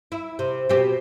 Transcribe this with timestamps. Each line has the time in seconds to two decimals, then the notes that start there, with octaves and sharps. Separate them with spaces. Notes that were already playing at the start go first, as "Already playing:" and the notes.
0.12 E4
0.39 C3
0.69 B2 C4 G4